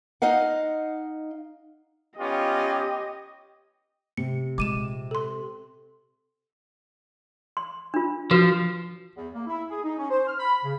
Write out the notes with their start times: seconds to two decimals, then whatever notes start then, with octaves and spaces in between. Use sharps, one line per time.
0.22 D#4 D#5 F5 F#5
2.19 B3 C#4 F4 G4 D#5
4.17 C3 C#7
4.58 A#2 G#3 D6 D#7 E7
5.11 A4 C6
7.57 C6
7.94 D4 F4
8.31 F3 F#4 B4
9.15 E2
9.34 A#3
9.47 E4
9.69 G#4
9.84 D#4
9.97 C#4
10.10 C5
10.27 F6
10.40 B5
10.63 C#3